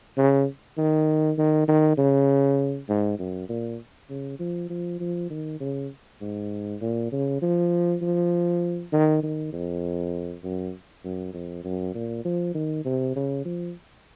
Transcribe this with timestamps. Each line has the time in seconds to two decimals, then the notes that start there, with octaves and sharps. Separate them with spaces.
0.17 C#3
0.77 D#3
1.38 D#3
1.68 D#3
1.97 C#3
2.89 G#2
3.19 F#2
3.49 A#2
4.09 C#3
4.39 F3
4.70 F3
5.00 F3
5.30 D#3
5.60 C#3
6.21 G#2
6.81 A#2
7.12 C#3
7.42 F3
8.02 F3
8.92 D#3
9.23 D#3
9.53 F2
10.44 F#2
11.04 F#2
11.33 F2
11.64 F#2
11.95 A#2
12.25 F3
12.54 D#3
12.85 C3
13.16 C#3
13.45 F3